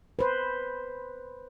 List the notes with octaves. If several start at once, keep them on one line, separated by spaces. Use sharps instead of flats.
B4 C5